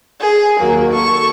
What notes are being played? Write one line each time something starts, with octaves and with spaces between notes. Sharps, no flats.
G#4
D#2 F#3 A#3
A4 C#6